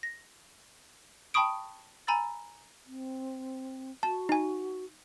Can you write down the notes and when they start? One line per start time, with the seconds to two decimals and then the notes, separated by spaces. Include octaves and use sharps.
0.03 A#6
1.34 G5 A5 B5 C#6 D#6 D7
2.07 G#5 A#5 B5 E6 A6
2.86 C4
4.03 F#4 A5
4.29 D#4 G#5